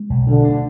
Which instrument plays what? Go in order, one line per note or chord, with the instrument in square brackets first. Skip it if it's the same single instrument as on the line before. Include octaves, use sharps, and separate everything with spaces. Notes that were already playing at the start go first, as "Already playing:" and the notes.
Already playing: [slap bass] G#3
B1
[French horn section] D2 D3 [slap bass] B2
[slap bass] D4